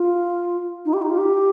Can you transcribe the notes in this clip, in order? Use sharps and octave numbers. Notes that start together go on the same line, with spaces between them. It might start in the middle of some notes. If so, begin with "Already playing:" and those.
Already playing: F4
D#4
G4
D#4
F4
G4